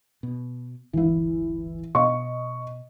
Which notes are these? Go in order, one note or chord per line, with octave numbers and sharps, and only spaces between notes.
B2
D1 G1 E3 E4
B2 B3 D#5 C#6